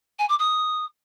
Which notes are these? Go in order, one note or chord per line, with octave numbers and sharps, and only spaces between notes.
G#5
D6
D#6